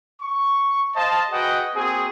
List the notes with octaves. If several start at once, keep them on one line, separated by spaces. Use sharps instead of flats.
C#6
C5 D#5 F5 A5
F#4 G#4 B4 D#5 F#5 G5
A#3 C4 F#4 G#4